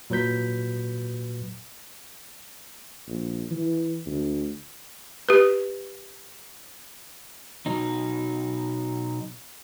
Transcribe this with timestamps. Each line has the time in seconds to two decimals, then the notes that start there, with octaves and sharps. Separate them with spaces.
0.10 A#2 F#3 B4 G6 B6
3.08 A#1
3.51 E3
4.06 D2
5.29 G4 B4
7.66 B2 F#3 D#4